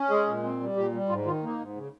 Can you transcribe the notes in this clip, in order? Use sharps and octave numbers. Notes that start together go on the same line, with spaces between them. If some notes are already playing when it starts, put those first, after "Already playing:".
Already playing: C#4
G#3 G#4
A#2
C4
G3
A#2 G4
G3
G#2 F4
D#3 F4
A#3 D#4
G#2
C#3